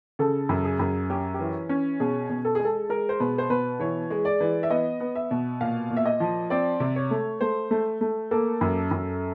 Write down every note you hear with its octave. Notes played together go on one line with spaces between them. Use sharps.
C#3 A4
F#2
G#4
F#2
C#4 G4
G4
E3
C#4
B2 G#4
B2
A4
G#3 G#4
A4
G#3 A#4
C5
B2 B4
C5
B2 B4
E3 C#5
G#3
D5
E3
E5
B3 D#5
B3
E5
B2
A#2 F5
A#2
E5
D#5
F3
C4 D5
C3
C#5
A3
A3 C5
A3
A3
A#3 A4
F#2
F#2